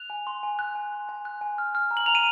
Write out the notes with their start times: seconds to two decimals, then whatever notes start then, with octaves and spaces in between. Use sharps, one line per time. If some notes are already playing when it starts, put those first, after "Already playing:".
Already playing: F#6 F7
0.10 G#5
0.27 C6
0.43 G#5
0.59 F#6
0.75 G#5
0.93 C6
1.09 G#5
1.25 F#6
1.41 G#5
1.58 F6
1.75 F6
1.91 A#5
1.97 F#7
2.06 A#5 F7
2.15 D#7